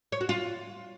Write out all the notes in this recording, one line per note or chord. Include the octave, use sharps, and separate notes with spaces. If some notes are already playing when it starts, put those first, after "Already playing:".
C#5
F#4
F4